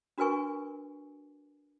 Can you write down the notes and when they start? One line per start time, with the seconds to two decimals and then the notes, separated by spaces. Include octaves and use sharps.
0.18 D4 F#4 A#4 B4 G#5 C#6